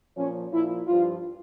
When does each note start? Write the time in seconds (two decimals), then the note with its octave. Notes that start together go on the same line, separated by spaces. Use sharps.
0.17 A#2 F3 C#4
0.53 A#2 F3 E4
0.87 G2 F3 F4